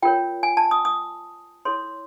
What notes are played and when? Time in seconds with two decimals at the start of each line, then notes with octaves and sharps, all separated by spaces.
0.03 F4 A#4 C#5 G5
0.43 G#5
0.57 A5
0.71 D#6
0.85 D#6
1.65 E4 A4 C#5 C6